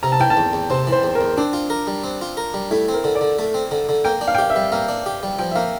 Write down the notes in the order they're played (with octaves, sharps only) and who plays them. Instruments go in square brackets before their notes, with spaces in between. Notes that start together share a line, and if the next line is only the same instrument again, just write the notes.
[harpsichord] C3 [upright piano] A#5
[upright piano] A5
[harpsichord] E3 [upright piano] G5
[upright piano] A5
[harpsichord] E2
E2
[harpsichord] C3 [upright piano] C5
[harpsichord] E3
[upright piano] C5
[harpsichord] E2
[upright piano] A#4
[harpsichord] E2
[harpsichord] C4 [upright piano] D4
[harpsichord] F4
A#4
G3
C4
F4
A#4
G3
[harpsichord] A3 [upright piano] E4
[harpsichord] C4
[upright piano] A#4
[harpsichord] D3
[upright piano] D5
[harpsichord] D3
A3
C4
D3
D3
[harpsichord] A#3 [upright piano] G5
[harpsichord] D4
[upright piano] F5
G5
[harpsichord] G4 [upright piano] F5
[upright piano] E5
[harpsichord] G3
[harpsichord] A#3 [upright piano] F5
[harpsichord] D4
G4
G3
[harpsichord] F3 [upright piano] G5
[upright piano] E5
[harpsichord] A#3 [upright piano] F5